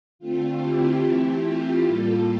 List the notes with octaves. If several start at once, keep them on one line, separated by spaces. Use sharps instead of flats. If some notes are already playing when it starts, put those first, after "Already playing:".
D3 A3 C4 F4
E4 G4
E3 A3 C4
F4
A2 G3 A#3 F4 A4